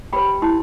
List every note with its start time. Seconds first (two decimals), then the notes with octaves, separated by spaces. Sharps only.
0.13 G4 B4 G5 B5
0.42 E4 A5 C6